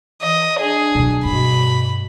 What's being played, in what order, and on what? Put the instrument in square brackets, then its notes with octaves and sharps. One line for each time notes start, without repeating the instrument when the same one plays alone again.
[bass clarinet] E3 [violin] D#5
[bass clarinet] D4 [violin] G#4
[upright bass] B2 F#3
[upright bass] G2 [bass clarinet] B2 [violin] B5